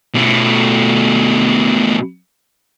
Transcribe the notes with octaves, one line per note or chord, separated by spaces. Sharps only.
B2 A3